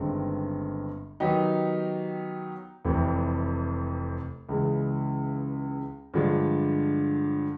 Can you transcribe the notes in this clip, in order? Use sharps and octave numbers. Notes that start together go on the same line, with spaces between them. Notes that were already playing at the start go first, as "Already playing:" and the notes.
Already playing: G1 G2 D#3 G#3 C4
D#3 F#3 B3 D#4 G4
F1 F2 C3 E3
C#2 C#3 E3 G#3
G2 D3 F3 G#3